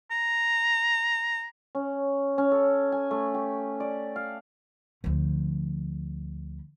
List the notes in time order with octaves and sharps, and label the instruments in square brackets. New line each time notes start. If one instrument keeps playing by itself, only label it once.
[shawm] A#5
[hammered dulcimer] C#4
C#4
A4
G#5
A3
G4
D5
F5
[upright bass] D2 F3